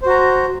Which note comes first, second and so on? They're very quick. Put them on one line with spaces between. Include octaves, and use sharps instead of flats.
C5 F#4 A#5